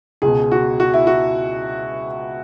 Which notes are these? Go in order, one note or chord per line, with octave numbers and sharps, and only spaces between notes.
C#2 B2 G#4
F#4
F#4
E4
F#4